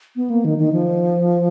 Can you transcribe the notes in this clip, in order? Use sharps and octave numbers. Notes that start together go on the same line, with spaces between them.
B3
A#3
D#3
D#3
F3